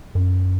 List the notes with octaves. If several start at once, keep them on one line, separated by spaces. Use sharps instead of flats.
F#2